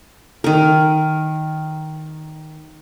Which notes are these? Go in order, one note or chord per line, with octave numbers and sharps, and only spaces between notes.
D#3 A#4